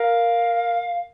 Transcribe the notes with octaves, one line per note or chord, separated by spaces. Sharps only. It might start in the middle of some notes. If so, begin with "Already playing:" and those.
Already playing: A#4 F5